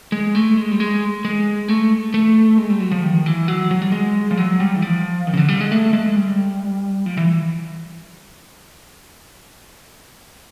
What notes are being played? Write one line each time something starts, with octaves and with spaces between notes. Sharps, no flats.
G#3
A3
G#3
G3
G#3
G#3
A3
A3
G#3
G3
F#3
F3
D#3
E3
F#3
F#3
G3
G#3
F3
F#3
G3
E3
F3
D#3
C#3
D3
G3
G#3
A3
G#3
G3
F3
E3